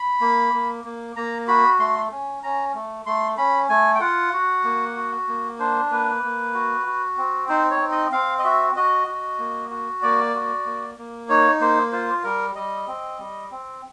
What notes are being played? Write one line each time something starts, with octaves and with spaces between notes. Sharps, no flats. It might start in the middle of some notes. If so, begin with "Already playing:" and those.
Already playing: B5
A#3
A#3
A#3
A#3 A#5
F#4 B5
A3 C6
C#4
C#4 A#5
A3
A3 C6
C#4 B5
A3 G#5
G5
F4 F#5
F#4
A#3
F#4
A#3
D4 C5
A#3 B4
A#3
F#4
F#4
C4
D#4 C5
C#5
C4
D#5
C4 F5
D#5
F#4 E5
F#4 D#5
F#4
A#3
F#4
A#3 D5
F#4
A#3
A#3
D#4 C#5
A#3 C5
F4 C5
G3 A#4
G3 D#5
C4
G3
C4